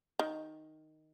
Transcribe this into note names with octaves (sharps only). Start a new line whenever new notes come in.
D#3